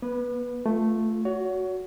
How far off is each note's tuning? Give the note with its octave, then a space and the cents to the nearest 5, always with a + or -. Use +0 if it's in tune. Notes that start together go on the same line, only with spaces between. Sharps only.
B3 -40 B4 -5
A3 +0 F4 +0
F#4 +0 C#5 +30